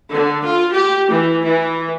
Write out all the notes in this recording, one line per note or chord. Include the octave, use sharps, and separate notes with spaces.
D3
F4
G4
E3
E3